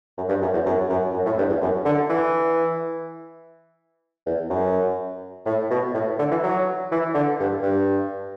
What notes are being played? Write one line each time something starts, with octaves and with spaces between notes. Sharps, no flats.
F#2
G2
F#2
E2
F#2
F#2
F#2
A2
G2
E2
F#2
D3
E3
E2
F#2
A2
B2
A2
D3
E3
F#3
E3
D3
G2
G2